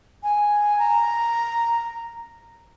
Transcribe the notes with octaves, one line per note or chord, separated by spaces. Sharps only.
G#5
A#5